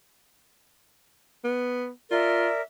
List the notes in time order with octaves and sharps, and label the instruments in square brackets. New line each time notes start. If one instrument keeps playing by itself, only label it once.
[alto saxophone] B3
[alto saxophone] F4 [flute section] A#4 D5 E5